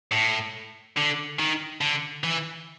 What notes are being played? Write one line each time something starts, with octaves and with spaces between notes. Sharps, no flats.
A2
D3
D#3
D3
E3